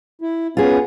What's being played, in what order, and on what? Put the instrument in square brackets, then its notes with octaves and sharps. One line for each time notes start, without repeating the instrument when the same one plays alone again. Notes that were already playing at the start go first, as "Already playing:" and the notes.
[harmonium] E4
[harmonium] B3 C#4 [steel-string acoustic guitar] F4 G#4